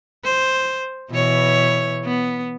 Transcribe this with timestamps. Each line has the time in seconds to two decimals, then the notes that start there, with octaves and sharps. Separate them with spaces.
0.24 C5
1.10 B2 E3 C#5
2.04 B3